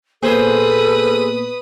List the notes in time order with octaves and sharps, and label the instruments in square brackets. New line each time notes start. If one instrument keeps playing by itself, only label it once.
[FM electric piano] A#2 A#3 B3 [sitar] G#4 C5 [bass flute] A4 [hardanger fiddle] B4 D#6